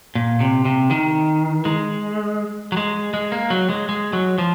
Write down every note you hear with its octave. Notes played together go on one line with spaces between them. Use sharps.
A#2
C3
C3
D#3
G#3
F#3
G#3
G#3
A#3
F#3
G#3
G#3
F#3
F3